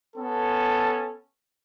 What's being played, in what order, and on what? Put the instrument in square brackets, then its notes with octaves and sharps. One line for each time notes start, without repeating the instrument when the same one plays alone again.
[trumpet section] B3 C#4 A4